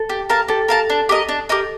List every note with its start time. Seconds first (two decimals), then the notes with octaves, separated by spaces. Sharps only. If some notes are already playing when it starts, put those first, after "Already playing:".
Already playing: A4
0.09 G4
0.30 A#4 F5 A5
0.48 G4 A4
0.68 A#4 F5 A5
0.90 D4
1.09 G4 A#4 D#5
1.29 D4
1.49 G4 A#4 D#5